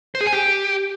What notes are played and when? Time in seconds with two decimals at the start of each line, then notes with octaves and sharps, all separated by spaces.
0.15 C5
0.21 G#4
0.27 G#5
0.33 G4